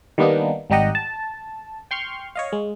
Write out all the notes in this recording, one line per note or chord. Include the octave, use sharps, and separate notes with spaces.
D#3 G3 A#3 B3 D4 D#4
G#1 G3 D#4 G4 D#5 F#5
A5
G5 C6 C#6 F6
C#5 D#5 F5
G#3